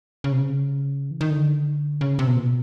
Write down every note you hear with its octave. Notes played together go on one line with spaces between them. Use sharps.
C#3
C3
C#3
E3
D#3
D3
C#3
C3
B2
A#2
B2